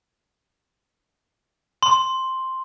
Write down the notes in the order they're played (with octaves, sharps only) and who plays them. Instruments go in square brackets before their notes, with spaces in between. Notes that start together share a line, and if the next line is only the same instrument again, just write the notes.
[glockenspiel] C6